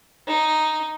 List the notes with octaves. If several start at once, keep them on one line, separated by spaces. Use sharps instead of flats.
D#4